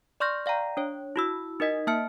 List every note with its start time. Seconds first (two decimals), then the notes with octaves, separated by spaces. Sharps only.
0.20 D5 C6 C#6 F6 G6 A#6
0.46 D5 F5 G5 A#5
0.77 D4 C#5
1.16 E4 F#4 E6
1.60 D#4 A#4 D#5 B6
1.87 A#3 E5 A5 F6 C#7